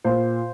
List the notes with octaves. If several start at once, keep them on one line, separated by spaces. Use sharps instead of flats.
A#2 C5